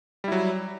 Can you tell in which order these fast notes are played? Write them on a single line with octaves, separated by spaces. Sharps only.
G3 E4 F#3